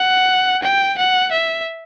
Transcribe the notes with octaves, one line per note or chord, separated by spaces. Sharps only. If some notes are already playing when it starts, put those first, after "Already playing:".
Already playing: F#5
G5
F#5
E5